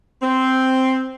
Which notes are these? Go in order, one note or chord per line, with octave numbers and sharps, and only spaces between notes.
C4